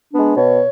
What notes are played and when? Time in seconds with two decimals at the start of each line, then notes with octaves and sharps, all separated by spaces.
0.13 G#3 B3 D4
0.37 B2 C#5